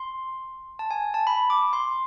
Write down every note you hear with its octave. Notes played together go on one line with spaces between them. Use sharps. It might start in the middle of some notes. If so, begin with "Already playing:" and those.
Already playing: C6
A5
G#5
A5
B5
D6
C6